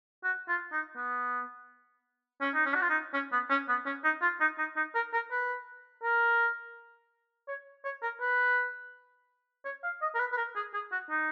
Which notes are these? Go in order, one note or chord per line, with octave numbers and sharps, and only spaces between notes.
F#4
F4
D#4
B3
C#4
D#4
C#4
F#4
F4
D#4
C#4
B3
C#4
B3
C#4
D#4
F4
D#4
D#4
D#4
A#4
A#4
B4
A#4
C#5
C#5
A#4
B4
C#5
F5
D#5
A#4
B4
B4
A#4
G#4
G#4
F#4
D#4